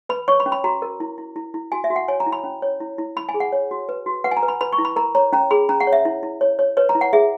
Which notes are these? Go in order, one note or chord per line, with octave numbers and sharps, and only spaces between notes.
B4 B5
C#5 C#6
B5
C#4
B5
F#4 A#5
A#4
E4
E4
E4
E4
F#4 G#5
E5
F#4
F#5
C#5 G#5
A#5
E4
B5
C#4
C#5
E4
E4
E4 B5
G#5
G#4
F#5
C#5
F#4
B4
F#4
B4 F#5
G#5
A#5
B4
B5
B4 B5
C#6
E4
B5
A#4 A#5
C#5 A#5
C#4 A#5
G#4 B5
C#4 A#5
F#5
C#5
E5
E4
E4
C#5
C#5
B4 C#5
A#5
E4
F#5
G#4 E5